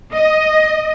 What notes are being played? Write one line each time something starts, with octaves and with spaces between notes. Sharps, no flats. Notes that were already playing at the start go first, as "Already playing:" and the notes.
D#5